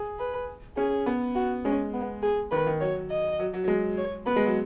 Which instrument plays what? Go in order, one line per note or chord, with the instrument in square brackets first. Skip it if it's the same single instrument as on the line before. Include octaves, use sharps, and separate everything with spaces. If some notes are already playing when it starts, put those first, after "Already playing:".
Already playing: [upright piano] G#4
[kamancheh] B4
[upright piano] C#4 [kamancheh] G#4
[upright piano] B3
[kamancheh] F#4
[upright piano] G#3 [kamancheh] C#4
[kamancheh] B3
G#4
[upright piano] D#3 [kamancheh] B4
[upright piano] D#3
[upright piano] F#3 [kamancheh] C#5
[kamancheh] D#5
[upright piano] F#3
F#3
F#3
G#3
[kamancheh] C#5
[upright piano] B3 [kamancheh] B4
[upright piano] G#3
F#3